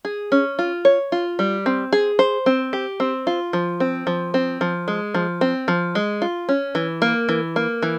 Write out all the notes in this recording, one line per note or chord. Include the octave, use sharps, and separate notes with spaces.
G#4
C#4
F4
C#5
F4
G3
C4
G#4
C5
C4
G4
C4
F4
F3
C4
F3
C4
F3
G#3
F3
C4
F3
G#3
F4
C#4
E3
A#3
E3
A#3
E3